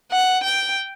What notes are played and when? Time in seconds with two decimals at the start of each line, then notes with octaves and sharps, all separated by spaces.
0.11 F#5
0.44 G5